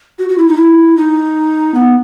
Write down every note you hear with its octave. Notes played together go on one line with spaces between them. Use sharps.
F#4
F#4
E4
D#4
E4
D#4
B3